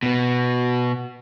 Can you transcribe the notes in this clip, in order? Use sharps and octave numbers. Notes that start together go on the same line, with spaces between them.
B2 B3